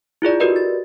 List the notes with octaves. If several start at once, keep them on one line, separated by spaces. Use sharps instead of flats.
E4 F4 G#4 D5
F#4 G4 A#4 B4 D5 D#5
A6